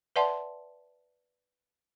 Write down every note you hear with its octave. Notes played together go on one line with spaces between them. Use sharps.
B4 D5 E5 F#5 A5 C6